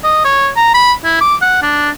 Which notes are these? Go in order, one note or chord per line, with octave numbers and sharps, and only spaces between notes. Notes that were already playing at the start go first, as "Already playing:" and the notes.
D#5
C#5
A#5
B5
E4
D6
F#5
D4